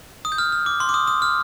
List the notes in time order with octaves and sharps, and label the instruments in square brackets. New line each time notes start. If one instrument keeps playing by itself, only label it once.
[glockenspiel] D#6
G6
F6
F6
D6
C6
D6
D#6
D#6
F6